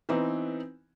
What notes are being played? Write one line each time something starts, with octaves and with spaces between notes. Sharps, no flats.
E3 B3 C4 D#4